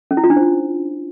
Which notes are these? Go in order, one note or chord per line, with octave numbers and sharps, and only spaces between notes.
C#4
E4
F4
D4
C5